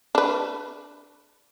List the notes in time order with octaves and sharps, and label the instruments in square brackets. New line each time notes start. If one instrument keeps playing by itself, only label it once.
[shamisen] D4 B4